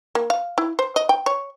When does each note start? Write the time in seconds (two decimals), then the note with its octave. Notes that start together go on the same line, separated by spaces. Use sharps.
0.15 A#3
0.30 F5
0.58 E4
0.79 C5
0.96 D#5
1.09 G5
1.26 C#5